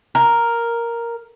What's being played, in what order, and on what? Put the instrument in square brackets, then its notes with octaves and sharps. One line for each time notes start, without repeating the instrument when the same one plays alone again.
[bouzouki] A#4